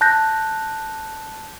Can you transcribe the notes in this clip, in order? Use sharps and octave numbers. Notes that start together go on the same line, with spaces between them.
A5 F#6 G6 A#6